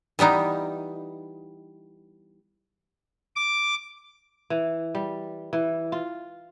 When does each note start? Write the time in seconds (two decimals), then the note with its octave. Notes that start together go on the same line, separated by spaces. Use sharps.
0.19 E3 G3 B3 D#4
3.36 D6
4.50 E3
4.95 G3
5.53 E3
5.92 F4